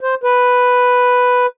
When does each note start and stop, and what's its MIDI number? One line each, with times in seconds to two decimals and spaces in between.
0.01 0.15 72
0.24 1.46 71